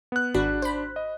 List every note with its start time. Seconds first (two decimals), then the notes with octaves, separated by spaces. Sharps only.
0.12 B3 F#6
0.34 G#1 D4 F#4 B5
0.62 C5 B5
0.96 D#5